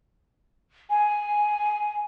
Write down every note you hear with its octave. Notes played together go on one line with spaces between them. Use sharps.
G#5